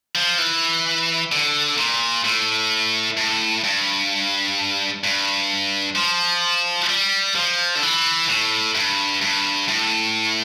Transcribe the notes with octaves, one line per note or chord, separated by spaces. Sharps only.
F3
E3
D3
A#2
A2
A2
G2
G2
F3
G3
F3
D3
E3
A2
G2
G2
A2